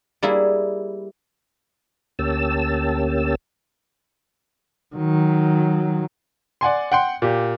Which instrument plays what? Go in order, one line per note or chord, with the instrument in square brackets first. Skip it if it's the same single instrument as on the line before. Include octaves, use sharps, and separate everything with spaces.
[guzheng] G3 A#3 E4 G#4
[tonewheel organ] D2 A#3 C#4 G4 A5 E6
[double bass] D#3 F#3
[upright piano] D5 F#5 G#5 C6
F#5 G5 C6
A#2 G4